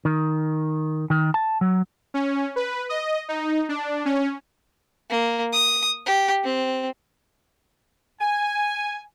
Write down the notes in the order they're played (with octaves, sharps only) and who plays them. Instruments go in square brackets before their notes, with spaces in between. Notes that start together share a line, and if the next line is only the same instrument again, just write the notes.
[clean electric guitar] D#3
D#3
A5
F#3
[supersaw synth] C#4
B4
D#5
D#4
D4
C#4
[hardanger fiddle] A#3
D#6
G4
C4
[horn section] G#5